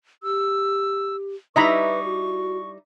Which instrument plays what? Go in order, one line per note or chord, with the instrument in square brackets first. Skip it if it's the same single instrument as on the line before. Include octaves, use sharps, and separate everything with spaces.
[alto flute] G4 [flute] E6
[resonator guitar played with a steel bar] G3 D#4 E4 [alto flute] B4 [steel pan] D#5 A#5 B5 [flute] C#6
[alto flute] F#4